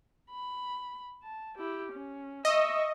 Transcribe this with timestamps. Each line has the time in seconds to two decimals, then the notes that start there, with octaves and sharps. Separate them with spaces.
0.31 B5
1.23 A5
1.58 E4 G4
1.92 C#4
2.45 D#5 E5 C#6